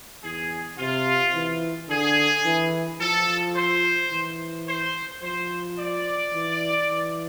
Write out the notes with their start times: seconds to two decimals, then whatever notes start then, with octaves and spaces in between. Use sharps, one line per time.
0.24 E2 G#4
0.78 C3 F4
1.34 E3
1.89 D3 G#4
2.45 E3
3.00 F3 A4
3.55 C5
4.11 E3
4.68 C5
5.22 F3 C5
5.78 D5
6.33 E3
6.89 E3